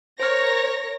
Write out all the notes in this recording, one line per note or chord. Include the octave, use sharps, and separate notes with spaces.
A#4 C5 C#5 F6 A#6